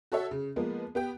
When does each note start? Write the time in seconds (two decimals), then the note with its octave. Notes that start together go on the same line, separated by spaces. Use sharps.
0.12 F#4 A4 C#5 E5
0.31 C#3
0.56 F3 G#3 A#3 B3
0.95 B3 G4 G5